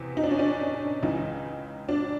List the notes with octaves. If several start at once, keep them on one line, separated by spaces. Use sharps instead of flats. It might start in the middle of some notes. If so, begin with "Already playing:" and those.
Already playing: E2 C3
D#4
D4
C#4
D4
C#2 C#3 E3 D#4
D4